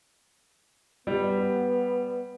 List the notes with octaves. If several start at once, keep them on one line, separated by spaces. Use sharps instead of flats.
G3 B3